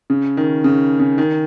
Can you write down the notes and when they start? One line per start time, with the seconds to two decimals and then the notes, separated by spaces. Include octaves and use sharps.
0.10 C#3
0.37 D#3
0.64 C#3
1.00 C#3
1.18 D#3